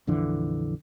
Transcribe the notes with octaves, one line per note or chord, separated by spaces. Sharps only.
A#1 F2 D3 E3